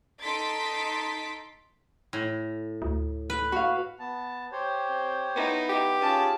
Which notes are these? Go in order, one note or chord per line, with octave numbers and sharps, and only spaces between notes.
D#4 A4 C6 A6 B6 D7
A2
D2
B4
F#4 F5
B3 A5
G4 C5 C#5
C4
B3 D#4 E4
G4
C#4 F4 G#4 A5